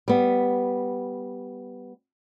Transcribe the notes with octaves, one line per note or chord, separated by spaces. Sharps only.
G3 B3